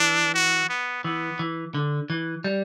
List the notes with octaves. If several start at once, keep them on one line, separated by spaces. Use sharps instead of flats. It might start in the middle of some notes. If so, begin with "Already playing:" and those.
Already playing: E3 D4
F#4
B3
E3 B3
E3
D3
E3
G3